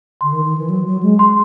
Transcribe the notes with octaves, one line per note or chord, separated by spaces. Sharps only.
D3 C6
D#3
D#3
E3
F#3
F#3
G#3
C6